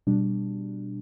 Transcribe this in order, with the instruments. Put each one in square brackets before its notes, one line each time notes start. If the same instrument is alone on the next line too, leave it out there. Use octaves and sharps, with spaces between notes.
[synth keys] B2 G3 D4